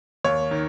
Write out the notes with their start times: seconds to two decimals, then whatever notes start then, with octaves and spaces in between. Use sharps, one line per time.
0.25 D#2 C#5
0.51 D#3